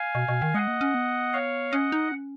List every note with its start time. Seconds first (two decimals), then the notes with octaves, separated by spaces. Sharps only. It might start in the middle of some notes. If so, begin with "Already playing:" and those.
Already playing: F5 G#5
0.15 B2
0.29 B2
0.42 D#3
0.54 G#3 D#5 F#5
0.68 A#3
0.81 C#4
0.94 B3
1.33 C#5 F5
1.72 C#4 D#5 F#5
1.92 D#4
2.12 C#4